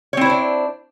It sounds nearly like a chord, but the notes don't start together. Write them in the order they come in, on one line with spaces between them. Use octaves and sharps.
C#5 C4 E4 C5 D4